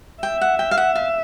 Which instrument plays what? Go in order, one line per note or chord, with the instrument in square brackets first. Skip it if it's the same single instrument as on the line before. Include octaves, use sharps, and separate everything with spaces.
[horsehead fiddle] E5 [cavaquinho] G5
[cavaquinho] F#5
G5
F5
F#5
F5